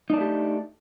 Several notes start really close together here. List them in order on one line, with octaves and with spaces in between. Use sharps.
D#4 D4 A3 G4